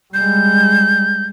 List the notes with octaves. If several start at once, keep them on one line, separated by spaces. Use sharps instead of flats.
G3 G#3 G6